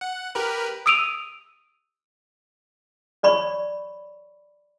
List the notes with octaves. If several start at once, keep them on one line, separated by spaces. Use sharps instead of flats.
F#5
G4 A#4 B4
D#6 E6 D7 D#7 F7
C#5 D5 B5 C#6